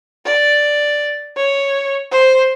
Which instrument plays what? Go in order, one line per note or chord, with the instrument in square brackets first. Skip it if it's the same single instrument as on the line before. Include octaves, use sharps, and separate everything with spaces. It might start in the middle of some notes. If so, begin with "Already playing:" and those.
[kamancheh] D5
C#5
C5